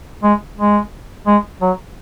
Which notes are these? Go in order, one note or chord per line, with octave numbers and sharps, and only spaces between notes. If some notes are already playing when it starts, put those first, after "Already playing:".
G#3
G#3
G#3
F#3